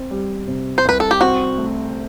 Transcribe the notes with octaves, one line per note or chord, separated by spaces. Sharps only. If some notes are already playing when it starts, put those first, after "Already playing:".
Already playing: C4
G3
C3
C5
C2 B4
A4
G4
C4 F#4
A3